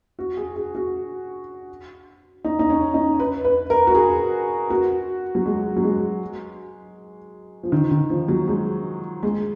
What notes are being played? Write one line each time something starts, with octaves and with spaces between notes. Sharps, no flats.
F#4
G#4
G#4
F#4
D#4
D#4
C#4
D#4
B4
B4
A#4
F#4
G#4
F#4
F#3
G#3
F#3
G#3
F3
D#3
D#3
F3
F#3
G#3
G#3